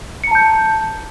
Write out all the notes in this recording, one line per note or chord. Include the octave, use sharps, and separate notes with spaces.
A5 A#5 G6 C#7